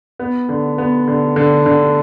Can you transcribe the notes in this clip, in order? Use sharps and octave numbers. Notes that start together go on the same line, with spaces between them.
B3
D3
B3
D3
D3
D3